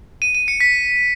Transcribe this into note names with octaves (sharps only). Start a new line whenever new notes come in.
D#7
D#7
C#7
B6